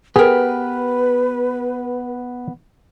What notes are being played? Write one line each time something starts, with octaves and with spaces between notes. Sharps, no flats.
B3 G4 G#4 A#4 B4